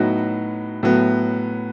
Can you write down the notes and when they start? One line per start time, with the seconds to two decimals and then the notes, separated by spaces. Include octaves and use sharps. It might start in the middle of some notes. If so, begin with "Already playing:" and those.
Already playing: A2 F#3 B3 D#4 F#4
0.83 A2 F#3 B3